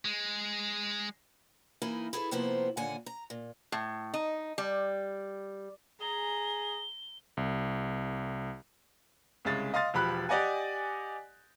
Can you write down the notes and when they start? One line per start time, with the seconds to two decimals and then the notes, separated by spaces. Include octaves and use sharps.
0.05 G#3
1.82 E3 A#3 D#4 E4 A#4 G#5
2.13 E4 G#4 A4 B4
2.31 C3 F3 A#3 B3 E4 C5
2.77 D#2 A#2 D3 F#5 G#5
3.06 A#5
3.30 A#2
3.72 A2
4.14 D#4
4.58 G3
6.01 G#4 A#5 G7
7.37 C2
9.45 C2 C#3 G#3 A6
9.74 D#5 F5 C6 A6
9.94 E1 F3 G4 B5 F#6
10.29 G4 D5 D#5 F#5 G#5